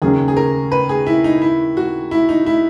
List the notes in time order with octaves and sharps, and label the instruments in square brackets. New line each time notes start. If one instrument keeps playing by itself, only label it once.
[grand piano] D#2 C#3 F#3 C#4 [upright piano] G#4
[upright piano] G#4
A#4
B4
G#4
E4
D#4
E4
F#4
E4
D#4
E4